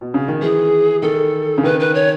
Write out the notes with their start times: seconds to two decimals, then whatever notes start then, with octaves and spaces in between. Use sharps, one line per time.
0.01 B2
0.14 C#3
0.28 D#3
0.42 E3 G#4
1.02 D#3 A4
1.58 C#3
1.63 D#3 B4
1.80 B4
1.95 C#5